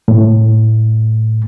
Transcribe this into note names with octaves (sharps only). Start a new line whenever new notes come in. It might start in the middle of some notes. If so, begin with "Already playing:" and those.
A2